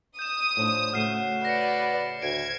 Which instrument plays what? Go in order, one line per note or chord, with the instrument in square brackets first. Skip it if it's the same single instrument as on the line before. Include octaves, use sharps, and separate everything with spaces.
[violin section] D#6 [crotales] G6 E7
[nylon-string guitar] A2 D4 [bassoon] F3
[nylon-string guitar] A2 C#3 A3 [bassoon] F#4 [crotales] F6 C7 E7
[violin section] B4 D5 [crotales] A#6 C#7
[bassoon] D2 [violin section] G#6 [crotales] D7